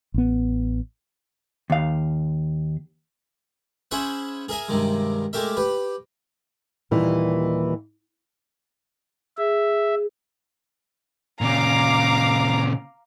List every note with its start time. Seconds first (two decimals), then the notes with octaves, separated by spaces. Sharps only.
0.14 A1 B3
1.70 D#2 F5
3.91 C#4 E4 G#4 C5 E5 F#5
4.49 G#4 A#4 E5 G#5
4.68 G2 C3 D#3 G#3
5.33 G#3 A3 G4 A#4 E5
5.57 G4 B4
6.91 D#2 A#2 E3 G3
9.38 G#4 E5
11.41 A#2 C#3 F5 A#5 D6